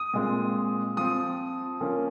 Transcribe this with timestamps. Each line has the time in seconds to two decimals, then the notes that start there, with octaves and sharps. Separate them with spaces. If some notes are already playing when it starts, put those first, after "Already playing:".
Already playing: D#6
0.14 A#2 G#3 C4
0.97 F3 C4 D#6
1.81 F3 A#3 C#4